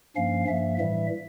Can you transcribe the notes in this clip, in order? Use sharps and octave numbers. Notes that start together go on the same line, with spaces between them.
G2 F3 A#3 C#4 F5
G2 F3 A#3 E5
A2 E3 G3 E5